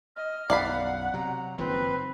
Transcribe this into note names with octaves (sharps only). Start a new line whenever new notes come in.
D#5 F6
B1 F#2 D5 F5 F#5 B5
C3 F#3 A#5
F#1 D#3 F3 C4 B4